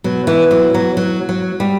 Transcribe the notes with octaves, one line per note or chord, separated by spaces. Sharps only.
B2 F#3
E3
F#3
F#3
F#3
F#3
G3